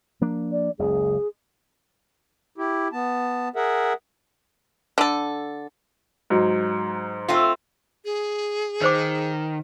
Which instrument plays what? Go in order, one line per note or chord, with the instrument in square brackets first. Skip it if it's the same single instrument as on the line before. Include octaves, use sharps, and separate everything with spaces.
[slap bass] F3 A#3 D4
[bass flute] D5
[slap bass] F#1 C#2 [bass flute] G#4
[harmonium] E4 G4
B3 A5
G#4 A#4 E5 F#5
[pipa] D3 A4
[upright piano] G#2 F#3
[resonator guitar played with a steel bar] A3 C4 F4
[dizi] G#4
[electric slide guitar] D#3 [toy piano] B4 C5 D6